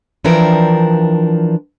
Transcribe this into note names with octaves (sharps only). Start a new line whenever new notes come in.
E3 F3 D4 A#4 G5